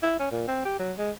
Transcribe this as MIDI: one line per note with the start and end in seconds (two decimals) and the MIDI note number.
0.03 0.19 64
0.20 0.30 61
0.31 0.47 46
0.48 0.63 60
0.65 0.79 67
0.79 0.92 54
0.98 1.11 56